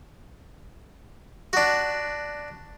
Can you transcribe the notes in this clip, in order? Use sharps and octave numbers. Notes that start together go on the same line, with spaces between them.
D4 F#4